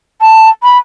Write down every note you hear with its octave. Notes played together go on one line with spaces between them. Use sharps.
A5
B5